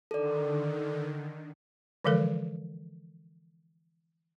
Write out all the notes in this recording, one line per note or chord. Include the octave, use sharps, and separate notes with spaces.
D3 D#3 A4 D5
D3 E3 F3 G#3 A4 A#4